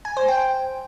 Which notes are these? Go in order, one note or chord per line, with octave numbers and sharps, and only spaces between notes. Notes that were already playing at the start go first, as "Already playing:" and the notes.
G#5
C5
G5